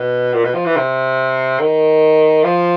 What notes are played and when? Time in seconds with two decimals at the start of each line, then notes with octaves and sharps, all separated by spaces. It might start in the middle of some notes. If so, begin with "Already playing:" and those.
Already playing: B2
0.34 A#2
0.44 B2
0.55 F3
0.65 E3
0.77 C3
1.59 D#3
2.44 F3